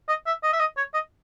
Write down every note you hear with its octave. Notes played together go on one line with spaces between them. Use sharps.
D#5
E5
D#5
E5
D#5
C#5
D#5